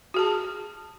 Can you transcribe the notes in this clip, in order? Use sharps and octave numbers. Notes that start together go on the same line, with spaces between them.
F#4 G#4 A5